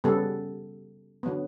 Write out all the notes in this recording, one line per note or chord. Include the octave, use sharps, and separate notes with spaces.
C#3 G3 B3 A4
D3 F#3 B3